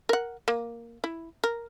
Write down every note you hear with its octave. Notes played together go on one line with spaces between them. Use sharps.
A#4 F#5
A#3
E4
A#4